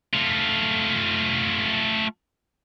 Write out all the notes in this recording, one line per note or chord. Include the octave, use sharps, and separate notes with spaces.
A3 F4